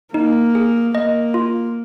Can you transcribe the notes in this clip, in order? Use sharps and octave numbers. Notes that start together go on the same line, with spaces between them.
A#3 D#4
G#4
A#3 D#5
F4